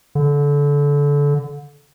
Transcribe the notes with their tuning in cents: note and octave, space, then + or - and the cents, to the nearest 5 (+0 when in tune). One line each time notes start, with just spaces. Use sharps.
D3 -25